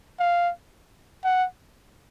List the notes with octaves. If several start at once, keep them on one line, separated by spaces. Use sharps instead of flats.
F5
F#5